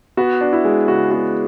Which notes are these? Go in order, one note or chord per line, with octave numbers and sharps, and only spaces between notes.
B3 F#4
D4
E4
G#3
C#3 F#4
B3 F#4